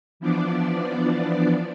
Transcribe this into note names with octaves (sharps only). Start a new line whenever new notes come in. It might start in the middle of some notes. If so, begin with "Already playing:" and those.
E3 F3 B3 D4 D5